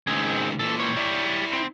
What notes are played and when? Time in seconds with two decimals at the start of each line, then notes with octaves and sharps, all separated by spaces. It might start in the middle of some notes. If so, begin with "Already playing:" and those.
0.07 C#2 D#3 C4 G#4
0.59 A#2 E3 A4
0.80 G3 C#5
0.97 E4 D5
1.52 D2 C4